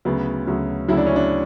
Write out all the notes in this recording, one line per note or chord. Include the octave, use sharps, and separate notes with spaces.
D2 C#3 F#3 B3
D2 C#3 F#3
D2 C#3 F#3 E4
D4
C#4
D4